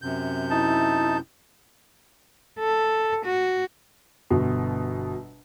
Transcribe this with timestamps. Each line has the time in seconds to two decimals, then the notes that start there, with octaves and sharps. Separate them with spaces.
0.02 F#2 C3 G6
0.50 D#4 E4 A5
2.59 A4
3.26 F#4
4.31 G1 B2